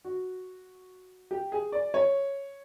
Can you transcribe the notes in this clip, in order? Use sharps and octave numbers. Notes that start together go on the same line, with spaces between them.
F#4
G4
G#4
D5
C#5